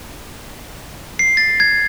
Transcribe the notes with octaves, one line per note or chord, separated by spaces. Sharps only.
C7
A6
G#6